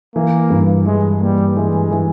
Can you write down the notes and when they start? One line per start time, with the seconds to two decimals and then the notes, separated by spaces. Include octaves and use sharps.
0.15 E3 A#3
0.50 G2
0.86 E3 G#3
1.21 G3 A#3
1.56 E3 G#3
1.91 E3